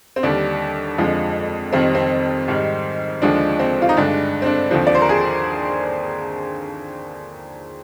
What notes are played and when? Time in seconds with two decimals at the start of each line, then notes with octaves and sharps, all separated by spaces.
0.16 C4
0.23 D#2 D3 G3 D4
0.98 F2 D3 F3 G#3
1.73 F2 D#3 G3 C4
1.95 C4
2.48 G#2 D#3 G3
3.22 D#2 D3 F3 G#3 D4
3.59 C4
3.82 F4
3.89 D#4
3.97 G2 D3 G#3 D4
4.42 C4
4.46 D4
4.71 D#2 D3 F3 C4
4.87 D5
4.95 C5
5.02 A#4
5.09 G#4